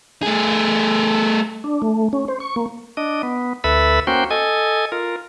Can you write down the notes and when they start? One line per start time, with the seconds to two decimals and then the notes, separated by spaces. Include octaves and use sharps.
0.23 A3 G#4
1.64 D4
1.82 A3
2.13 C#4
2.28 C5
2.40 C#6
2.56 A#3
2.97 D4 D#5
3.23 B3
3.64 D2 A4 B4 E5 B5
4.07 A#3 C#4 F#4 C5 G5
4.31 A4 D#5 G#5
4.92 F4 A#4